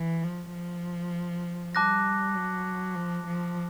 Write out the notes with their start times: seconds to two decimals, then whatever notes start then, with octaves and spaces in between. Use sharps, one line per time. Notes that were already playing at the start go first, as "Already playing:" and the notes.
Already playing: E3
0.23 F3
0.54 F3
1.75 G3 A5 D6 F#6 A#6
2.35 F#3
2.95 F3
3.26 F3